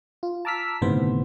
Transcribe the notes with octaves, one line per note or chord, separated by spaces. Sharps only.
F4
A5 A#5 D6 E6 F6 B6
G1 A2 C3 D#3 B3 C5